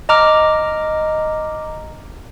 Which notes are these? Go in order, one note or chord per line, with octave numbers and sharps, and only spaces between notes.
D#5 A#5 D6 F6